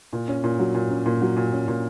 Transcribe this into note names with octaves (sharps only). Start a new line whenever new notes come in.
A#2
C#4
A#2
F#3
A#2
C#4
A#2
F#3
A#2
C#4
A#2